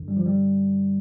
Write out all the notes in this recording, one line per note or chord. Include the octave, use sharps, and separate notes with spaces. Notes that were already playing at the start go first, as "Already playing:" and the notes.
Already playing: G2 D3
G3
F3
G3